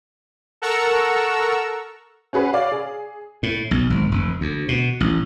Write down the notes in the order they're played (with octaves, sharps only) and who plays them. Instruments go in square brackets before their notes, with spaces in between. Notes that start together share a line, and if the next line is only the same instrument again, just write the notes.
[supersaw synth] A4 A#4 F#5 A#5 C#6 E6
[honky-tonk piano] C#4 F#4 G#4 B4
C#5 D5 F5
G#4
[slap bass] A2
B1
G#1
F1
D2
B2
A1